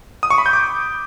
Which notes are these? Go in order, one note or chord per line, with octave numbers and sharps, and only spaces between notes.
D#6
C#6
B5
G6
D6